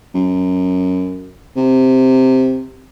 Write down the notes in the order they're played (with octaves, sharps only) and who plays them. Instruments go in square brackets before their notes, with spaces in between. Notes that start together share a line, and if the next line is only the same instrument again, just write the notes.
[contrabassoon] F#2
C3